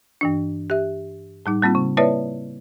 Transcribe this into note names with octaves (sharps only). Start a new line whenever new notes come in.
G2 E3 D4
G4 E5
A2 G3 D#4
G3 A#3 C4 F4
C#3
A#3 E4 B4 C#5 D5 E5